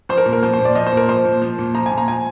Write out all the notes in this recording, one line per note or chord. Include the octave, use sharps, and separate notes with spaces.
F3 C5
A#4
A#2
A#4
F3 C5
C5
A#2
D5
F3 D#5
C5
A#2 A#4
F3 C5
A#2
F3
A#2
F3 A#5
G#5
A#2
A#5
F3 G#5